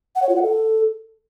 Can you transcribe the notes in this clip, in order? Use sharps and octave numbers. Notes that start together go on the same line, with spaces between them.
F#5
C#5
F4
F#5
A4